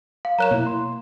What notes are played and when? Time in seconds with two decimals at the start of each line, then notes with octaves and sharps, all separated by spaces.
0.25 F5
0.38 F#3 A#4 C#5 A#5 F#6 E7
0.51 B2 A#3 E4
0.67 C6